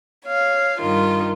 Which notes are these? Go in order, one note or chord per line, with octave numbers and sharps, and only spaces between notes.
C#5 F5
G2 D#3 F4